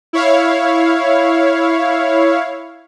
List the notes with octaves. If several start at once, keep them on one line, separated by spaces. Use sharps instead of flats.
E4 C#5 F5